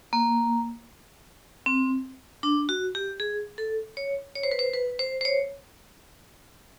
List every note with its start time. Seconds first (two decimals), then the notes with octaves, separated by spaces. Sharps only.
0.13 A#3
1.66 C4
2.43 D4
2.69 F#4
2.95 G4
3.20 G#4
3.58 A4
3.97 C#5
4.35 C#5
4.43 C5
4.51 B4
4.59 C5
4.73 B4
4.99 C5
5.21 C5
5.25 C#5